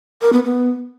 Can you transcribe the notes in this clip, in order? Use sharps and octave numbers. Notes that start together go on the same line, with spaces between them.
A#4
B3
B3